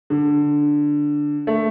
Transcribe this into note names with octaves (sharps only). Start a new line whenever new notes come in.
D3
A3